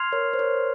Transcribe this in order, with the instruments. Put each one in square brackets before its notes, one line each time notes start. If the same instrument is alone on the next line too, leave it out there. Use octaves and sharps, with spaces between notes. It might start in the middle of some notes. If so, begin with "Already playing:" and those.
Already playing: [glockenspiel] C6 F6 G#6 C7 F7
[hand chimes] A#4 C#5
C5
A#4 C#5